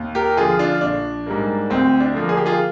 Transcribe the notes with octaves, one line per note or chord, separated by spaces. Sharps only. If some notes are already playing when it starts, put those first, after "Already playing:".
Already playing: D#2
G4 A#4
D3 F3 F4 G#4
D4 F4
A#1 D4
G#2 G3 A#3
D2 C4
D4
D3 F3 A#3
G#4
G4
F4 G#4